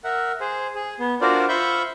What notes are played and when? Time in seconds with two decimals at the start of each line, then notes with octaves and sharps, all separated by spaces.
0.04 A#4 E5 F#5
0.40 G#4 C5
0.75 G#4
0.99 B3
1.21 D4 F4 F#4 A#4 C5 D5
1.49 F4 C5 E5 B5 C#6 G6